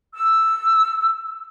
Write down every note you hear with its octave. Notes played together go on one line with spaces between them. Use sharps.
E6